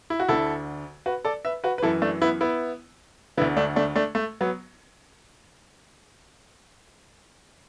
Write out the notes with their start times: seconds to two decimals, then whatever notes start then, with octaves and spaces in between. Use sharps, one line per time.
0.10 E4
0.20 F#4
0.28 D2 D3 E4 A4
1.06 F#4 B4
1.25 A4 D5
1.45 B4 E5
1.64 F#4 B4
1.78 B4
1.83 F#2 E3 E4 A4
2.02 A3 D4
2.22 B3 E4
2.41 B3 E4
3.37 D3 B3 E4
3.41 D2
3.57 A3 D4
3.76 A3 D4
3.96 A3 D4
4.15 A3
4.41 F#3 B3